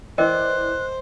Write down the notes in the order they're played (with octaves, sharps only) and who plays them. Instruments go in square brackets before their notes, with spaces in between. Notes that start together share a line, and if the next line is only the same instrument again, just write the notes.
[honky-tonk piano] E3 D5 [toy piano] A#4 D#5 G5 [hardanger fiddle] C5 [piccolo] F#6